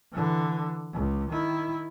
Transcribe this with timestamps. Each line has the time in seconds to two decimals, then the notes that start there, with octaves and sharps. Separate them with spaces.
0.12 D3 E3
0.94 C#2
1.31 D#3 E4